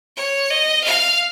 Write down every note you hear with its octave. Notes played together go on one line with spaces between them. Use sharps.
C#5
D#5
F5